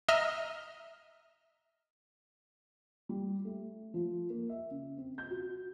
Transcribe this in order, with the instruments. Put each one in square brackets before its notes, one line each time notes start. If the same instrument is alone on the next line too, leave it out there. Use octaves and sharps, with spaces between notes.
[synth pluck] D#5 E5 A#5 F6
[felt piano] G3
A3
F3
A#3
E5
C#3
C4
G6
F#4